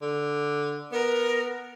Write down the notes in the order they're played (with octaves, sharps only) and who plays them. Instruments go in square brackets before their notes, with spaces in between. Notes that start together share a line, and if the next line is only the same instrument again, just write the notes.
[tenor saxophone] D3
[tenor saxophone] B3 [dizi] A#4